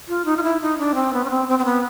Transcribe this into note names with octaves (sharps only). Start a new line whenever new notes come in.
F4
D#4
F4
E4
D#4
D4
C4
B3
C#4
C4
C4
C4
B3